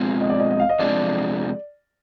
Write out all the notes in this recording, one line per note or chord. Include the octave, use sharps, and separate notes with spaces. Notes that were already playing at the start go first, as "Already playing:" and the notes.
Already playing: B2 G#3 C4 F4 G#4
D#5
D5
D#5
D#5
F5
D#5
F2 C3 F3 G#3 D4 D5